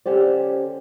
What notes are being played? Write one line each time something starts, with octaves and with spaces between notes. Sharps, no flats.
D3 C#4 G4 C5 D5